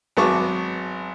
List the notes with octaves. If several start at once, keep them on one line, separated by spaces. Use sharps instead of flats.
G#1 F#3 B3 A5 C#6 D6